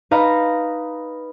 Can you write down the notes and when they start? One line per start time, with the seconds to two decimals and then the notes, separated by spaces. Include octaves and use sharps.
0.11 D#4 B4 F5 A#5